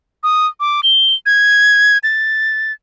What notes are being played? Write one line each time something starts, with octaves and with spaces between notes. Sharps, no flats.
D#6
D6
G7
G#6
A6